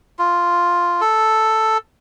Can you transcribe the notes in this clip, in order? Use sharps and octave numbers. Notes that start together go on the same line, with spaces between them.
F4
A4